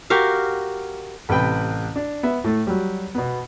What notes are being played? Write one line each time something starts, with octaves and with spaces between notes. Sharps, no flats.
F#4 G4 A#4 F5
A1 C3 B4 G5 B5
D4
B3 E5
A2 A3
F#3 G3
B2 B3